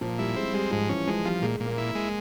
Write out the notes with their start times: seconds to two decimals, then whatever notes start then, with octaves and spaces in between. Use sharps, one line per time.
0.01 A#2 F3
0.19 G3 E4
0.36 G#3 C4
0.54 G3 G#3
0.71 G#2 F3
0.89 E3 C#4
1.07 F3 G#3
1.25 F3 G3
1.42 A#2 G#3
1.60 A#2
1.66 A#3
1.78 E4
1.95 G#3